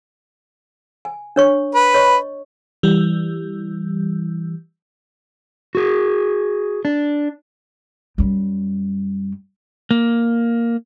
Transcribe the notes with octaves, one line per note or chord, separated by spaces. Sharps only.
G#5
D4 C#5 C#6
B4
C#5 D#5 C#6
E3 G3
F#4 G#4
D4
F#2 G3
A#3